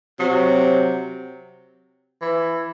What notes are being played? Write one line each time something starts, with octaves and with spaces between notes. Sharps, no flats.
C3 F#3
E3